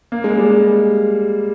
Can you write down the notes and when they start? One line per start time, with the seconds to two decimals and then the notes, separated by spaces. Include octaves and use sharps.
0.12 A#3
0.24 G#3
0.37 G3
0.51 G#3